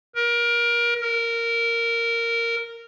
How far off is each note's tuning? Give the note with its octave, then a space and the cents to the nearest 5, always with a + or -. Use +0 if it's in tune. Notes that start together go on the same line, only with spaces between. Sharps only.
A#4 +25
A#4 -10